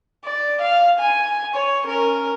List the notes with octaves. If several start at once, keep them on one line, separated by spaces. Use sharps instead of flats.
D5
F5
G#5
C#5
C#4 A#4